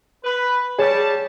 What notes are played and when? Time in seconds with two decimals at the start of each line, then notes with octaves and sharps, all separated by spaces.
0.24 B4
0.79 G3 G#4 C#5 A5 E7